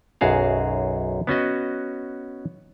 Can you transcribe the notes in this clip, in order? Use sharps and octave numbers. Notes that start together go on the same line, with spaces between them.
B1 F#2 F#4 G#4 F5
B3 C#4 F#4 D#5